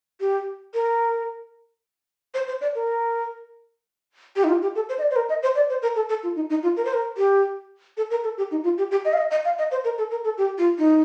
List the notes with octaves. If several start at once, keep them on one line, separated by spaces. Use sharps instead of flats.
G4
A#4
C5
C5
D5
A#4
G4
D#4
F4
G4
A4
C5
D#5
D5
C5
A#4
D#5
C5
D5
C5
A#4
A4
A4
F4
D#4
D#4
F4
A#4
C5
A#4
G4
A4
A#4
A4
G4
D#4
F4
G4
G4
D#5
F5
D#5
D#5
F5
D#5
C5
A#4
A4
A#4
A4
G4
F4
D#4